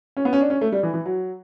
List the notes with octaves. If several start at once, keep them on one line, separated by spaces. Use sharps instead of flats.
C#4
B3
C#4
D4
C#4
A3
G3
E3
E3
F#3